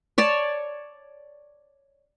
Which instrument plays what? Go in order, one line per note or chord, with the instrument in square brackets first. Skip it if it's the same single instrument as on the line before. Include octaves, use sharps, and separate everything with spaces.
[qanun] C#5 D5 A5